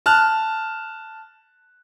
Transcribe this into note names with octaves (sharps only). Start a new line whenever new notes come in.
A5 F6 F#6